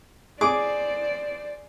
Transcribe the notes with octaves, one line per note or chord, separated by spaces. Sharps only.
G#4 C5 D5 D6